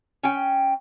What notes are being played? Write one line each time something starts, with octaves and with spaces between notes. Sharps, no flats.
C#4 G5